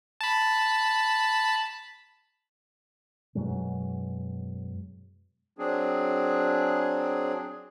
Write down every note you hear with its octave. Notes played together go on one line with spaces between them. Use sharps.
A5 B5
F#2 B2 F#3 G#3
F#3 C4 D4 G#4